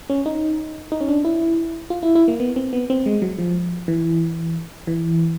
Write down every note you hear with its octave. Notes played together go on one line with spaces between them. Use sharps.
C#4
D#4
D#4
C#4
D4
E4
F4
E4
E4
A#3
B3
C4
B3
C4
G#3
F#3
F3
E3
E3